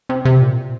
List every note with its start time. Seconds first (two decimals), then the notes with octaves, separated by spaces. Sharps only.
0.09 C3
0.25 C3
0.41 A#2